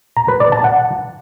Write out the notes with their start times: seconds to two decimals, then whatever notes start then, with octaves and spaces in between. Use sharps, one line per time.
0.17 A#5
0.28 B4
0.40 D5
0.52 A5
0.64 F#5